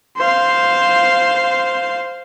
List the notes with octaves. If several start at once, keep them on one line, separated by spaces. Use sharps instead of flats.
C5 F5